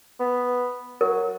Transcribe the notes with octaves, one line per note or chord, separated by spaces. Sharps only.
B3
F#3 A#4